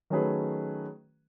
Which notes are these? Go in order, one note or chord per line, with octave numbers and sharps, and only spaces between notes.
D#3 F#3 A3 C#4 G#4 B4